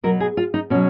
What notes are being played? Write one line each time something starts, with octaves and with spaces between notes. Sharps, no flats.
B2 F#3 A#4
G#4
F4
D#4
B2 F#3 C#4